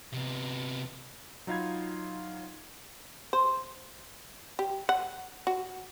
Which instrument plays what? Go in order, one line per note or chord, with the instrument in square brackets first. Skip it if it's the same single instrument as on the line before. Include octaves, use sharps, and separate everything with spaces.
[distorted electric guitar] C3 B3
[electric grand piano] F#3 D#4 F4 F5 B5 G#6
[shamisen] C5
G4
F#5
F#4